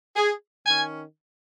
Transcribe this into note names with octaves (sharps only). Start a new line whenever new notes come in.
G#4
D#3 C#4 G#5